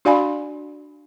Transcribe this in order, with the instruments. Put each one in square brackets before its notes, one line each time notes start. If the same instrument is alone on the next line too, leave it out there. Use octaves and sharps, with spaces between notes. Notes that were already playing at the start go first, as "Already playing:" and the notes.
[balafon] D4 F#4 D5 F5 G#5 B5